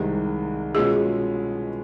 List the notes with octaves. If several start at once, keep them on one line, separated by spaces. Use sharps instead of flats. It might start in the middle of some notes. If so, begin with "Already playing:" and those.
Already playing: C2 C3 D#3 G#3 G4
B2 G#3 C#4 F4 G#4